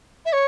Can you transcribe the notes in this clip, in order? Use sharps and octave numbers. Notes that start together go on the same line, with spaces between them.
E5
C#5